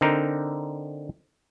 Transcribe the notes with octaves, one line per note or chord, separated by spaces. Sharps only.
D3 C4 D#4 A#4